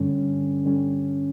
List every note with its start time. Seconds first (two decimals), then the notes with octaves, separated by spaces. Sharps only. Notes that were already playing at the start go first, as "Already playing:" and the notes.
Already playing: G2 D3 G3 C#4
0.64 G2 D3 G3 C#4